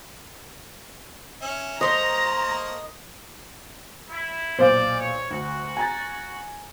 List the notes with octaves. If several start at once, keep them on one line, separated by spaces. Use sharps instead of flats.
C#4 E5
A3 A#3 C5 D#5 A#5 D#6
E4
B1 A#2 C5 D5 F5
C#5
D2 F#4
G#5 A#5 A6